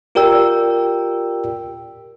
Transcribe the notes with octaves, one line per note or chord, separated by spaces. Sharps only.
F4 G4 A#4 D5 G5 E6